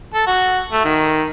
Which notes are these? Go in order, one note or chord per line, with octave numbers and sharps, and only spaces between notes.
A4
F#4
A3
D#3